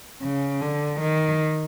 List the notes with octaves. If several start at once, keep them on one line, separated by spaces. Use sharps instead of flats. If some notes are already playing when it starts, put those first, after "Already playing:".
C#3
D3
D#3